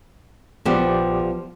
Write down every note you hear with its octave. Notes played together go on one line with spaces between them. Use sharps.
A#1 F3 B3 G4 D5